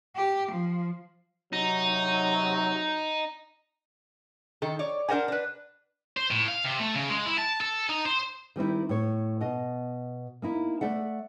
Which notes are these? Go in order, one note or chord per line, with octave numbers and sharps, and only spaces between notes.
G4
F3
C3 F#3 D#4
D#3 A4
C#5 D5
D4 A#4 C5 F#5 G#5
D4 B4
C5
A2
F5
C3
A3
C#3
G#3
E4
A5
A4
D#4
C5
D#3 G3 C4 E4
A2 C#5
B2 D#5
A#3 D#4 E4
A3 D5 E5 F#5